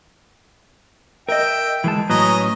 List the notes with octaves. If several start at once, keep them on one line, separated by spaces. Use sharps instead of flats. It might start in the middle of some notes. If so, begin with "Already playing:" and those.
A#4 D#5 E5 G5
E3 G#3 A5
A2 F#3 C#4 B4 D#5 A#5